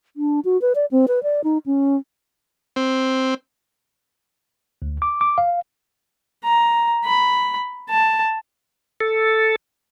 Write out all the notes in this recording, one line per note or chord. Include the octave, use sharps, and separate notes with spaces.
D4
F#4
B4
D5
C4
B4
D5
D#4
C#4
C4
D2
D6
D6
F5
A#5
B5
A5
A4